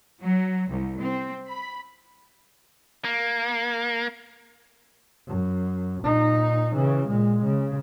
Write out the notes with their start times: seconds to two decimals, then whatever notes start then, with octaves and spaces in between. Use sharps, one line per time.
0.23 F#3
0.71 C2
1.00 C4
1.50 B5
3.05 A#3
5.27 F#2
6.03 A#2 D#4
6.75 C#3 E3
7.07 A#2 G#3
7.45 C#3